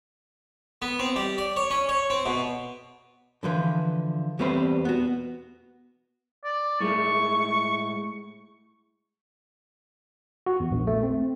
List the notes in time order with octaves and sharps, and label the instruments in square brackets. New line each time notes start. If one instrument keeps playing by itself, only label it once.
[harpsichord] B3
C4
G3
D5
C#5
C#4
C#5
C4
B2
[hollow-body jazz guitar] D3 E3 F3 B4
E2 G3 A3 C4 B4 C5
B3 F#4
[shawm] D5
[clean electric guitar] A2 G#3 A3 [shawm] C#6
[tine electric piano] F#4
E2
A#1
A3
C4